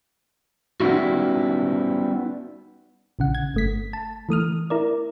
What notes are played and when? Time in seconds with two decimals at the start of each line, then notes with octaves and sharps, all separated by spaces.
0.80 G3 B3 C#4 D#4 E4 F#4
3.19 A#1 C#3 F#5
3.35 G#6
3.54 G1 A3 B6
3.93 A5
4.29 E3 A3 D#6 F6
4.70 E4 A#4 D5